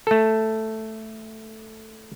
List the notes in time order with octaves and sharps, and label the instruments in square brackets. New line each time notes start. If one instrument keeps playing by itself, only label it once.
[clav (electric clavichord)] A3 A4